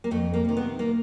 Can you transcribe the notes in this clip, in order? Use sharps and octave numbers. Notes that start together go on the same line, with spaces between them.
A#3
F2 A3
A#3
C3 D#3
B3
A#3